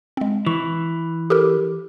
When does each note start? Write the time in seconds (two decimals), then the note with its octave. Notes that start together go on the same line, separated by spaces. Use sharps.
0.17 G#3 C4
0.46 E3 C#6
1.30 G4 A4 A#4